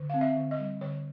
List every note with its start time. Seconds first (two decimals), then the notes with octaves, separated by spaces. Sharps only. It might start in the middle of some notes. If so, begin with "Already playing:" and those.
Already playing: D3
0.10 C4 F5
0.21 E5
0.36 D3
0.51 D#5
0.59 G3
0.81 D3 C#5